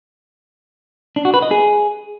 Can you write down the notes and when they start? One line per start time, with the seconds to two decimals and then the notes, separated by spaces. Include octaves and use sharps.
1.16 D4
1.25 F#4
1.34 B4
1.42 D#5
1.51 G#4